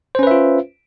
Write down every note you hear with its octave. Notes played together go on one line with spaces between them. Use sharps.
C#4 F4 B4 C5 E5